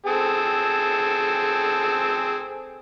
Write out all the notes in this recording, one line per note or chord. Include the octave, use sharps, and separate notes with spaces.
C4 G#4 A4